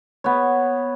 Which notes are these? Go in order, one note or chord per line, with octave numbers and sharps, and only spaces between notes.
B3 C#5